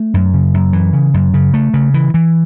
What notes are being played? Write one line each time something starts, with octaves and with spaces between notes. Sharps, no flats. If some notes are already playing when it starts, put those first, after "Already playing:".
Already playing: A3
F#2
C#3
F#2
E3
C#3
F#2
C#3
A3
C#3
E3
E3